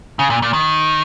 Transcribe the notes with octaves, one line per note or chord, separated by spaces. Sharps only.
C#3
A#2
A#2
D#3